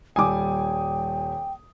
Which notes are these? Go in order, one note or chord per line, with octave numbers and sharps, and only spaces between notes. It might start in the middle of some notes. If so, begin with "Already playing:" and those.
D#1 G3 G5 G#5 D6 D#6